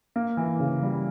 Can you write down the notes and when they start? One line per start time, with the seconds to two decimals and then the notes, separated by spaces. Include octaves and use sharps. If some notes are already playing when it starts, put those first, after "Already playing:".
0.16 A#3
0.37 E3
0.60 C#3
0.82 G3